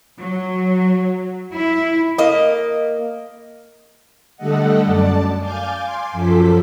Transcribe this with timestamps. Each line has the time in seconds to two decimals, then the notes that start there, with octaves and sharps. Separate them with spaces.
0.19 F#3
1.54 E4
2.18 A#3 D#5
4.37 D3 G3 A3 A4 D#5 F#5
4.83 F#2 D5 A5
5.40 F5 G#5 D6 G6 A6
5.80 G#5 C6 D6
6.12 F#2 F3 A4 B6